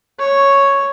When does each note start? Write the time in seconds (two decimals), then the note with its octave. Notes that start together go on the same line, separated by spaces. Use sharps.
0.20 C#5